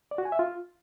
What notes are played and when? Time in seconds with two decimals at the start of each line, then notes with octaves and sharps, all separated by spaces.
0.11 D5
0.18 F#4
0.25 G#5
0.32 E5
0.39 F4